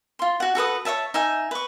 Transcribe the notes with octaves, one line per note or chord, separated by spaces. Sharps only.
F4 C6
F#4 F#5
F#4 A4 B4 D#6
C#5 D#5 E5 A5
D#4 E5 G#5
B4 C#6